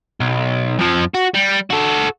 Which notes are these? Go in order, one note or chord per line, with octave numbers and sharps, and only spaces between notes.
B1
F2 F3
F#4
G3
F#4 A4